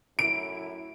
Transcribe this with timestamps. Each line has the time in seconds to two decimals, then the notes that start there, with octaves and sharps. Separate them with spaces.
0.19 F#2 A2 E4 D7